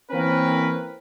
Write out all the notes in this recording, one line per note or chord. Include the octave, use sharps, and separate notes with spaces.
E3 A#3 C4 C#4 A#4 B4